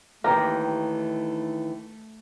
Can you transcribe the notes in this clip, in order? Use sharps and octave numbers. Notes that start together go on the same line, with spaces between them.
D#2 D#3 E3 A3 G4 A#4